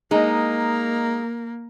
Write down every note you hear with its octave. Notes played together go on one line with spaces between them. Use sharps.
G#3 A#3 D#4